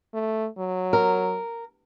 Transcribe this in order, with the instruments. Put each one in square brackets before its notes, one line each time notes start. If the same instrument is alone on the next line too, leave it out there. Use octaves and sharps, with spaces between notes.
[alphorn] A3
F#3
[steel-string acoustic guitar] A#4